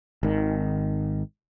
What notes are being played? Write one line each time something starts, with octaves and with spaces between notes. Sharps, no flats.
G#1 D#3